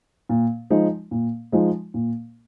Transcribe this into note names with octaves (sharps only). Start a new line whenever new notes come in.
A#2
F3 G#3 D#4
A#2
F3 G#3 D#4
A#2